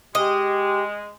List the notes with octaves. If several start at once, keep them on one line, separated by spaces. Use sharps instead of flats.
G#3 G4 D#5